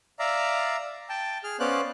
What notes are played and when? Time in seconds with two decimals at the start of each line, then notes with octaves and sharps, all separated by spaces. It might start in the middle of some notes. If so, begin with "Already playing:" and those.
0.19 D5 E5 F5 A#5
1.09 G5 A5
1.44 G#4 F6
1.60 B3 C#4 C5 D5 F5 F#6